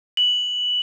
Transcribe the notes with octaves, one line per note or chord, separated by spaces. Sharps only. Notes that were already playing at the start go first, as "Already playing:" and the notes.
F#7